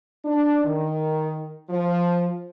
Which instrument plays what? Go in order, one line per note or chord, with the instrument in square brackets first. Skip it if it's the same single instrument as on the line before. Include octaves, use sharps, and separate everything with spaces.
[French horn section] D4
D#3
F3